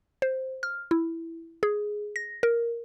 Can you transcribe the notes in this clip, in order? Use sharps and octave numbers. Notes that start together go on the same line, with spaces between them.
C5
F6
E4
G#4
A#6
A#4